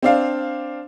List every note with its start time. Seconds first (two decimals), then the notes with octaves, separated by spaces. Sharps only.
0.03 C4 D4 F5